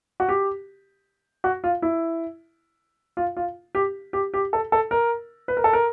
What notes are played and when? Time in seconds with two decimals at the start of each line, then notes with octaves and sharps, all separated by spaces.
0.20 F#4
0.29 G4
1.44 F#4
1.64 F4
1.82 E4
3.17 F4
3.37 F4
3.75 G4
4.13 G4
4.34 G4
4.53 A4
4.72 A4
4.91 A#4
5.48 B4
5.57 A#4
5.64 A4
5.73 A#4